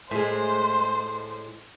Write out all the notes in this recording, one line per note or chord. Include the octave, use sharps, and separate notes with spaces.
A2 G#3 C5